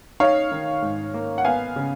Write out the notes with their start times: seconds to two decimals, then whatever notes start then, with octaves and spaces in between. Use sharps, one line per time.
0.20 D#4 C#5 F5
0.52 D#3
0.82 G#2
1.14 A#3
1.38 F#5
1.45 B3 F5 G#5
1.76 C#3